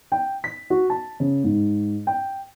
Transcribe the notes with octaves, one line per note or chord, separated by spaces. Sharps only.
G5
B6
F#4
A5
C#3
G#2
G5